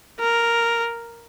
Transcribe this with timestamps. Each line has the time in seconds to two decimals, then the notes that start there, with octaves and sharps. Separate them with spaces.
0.20 A#4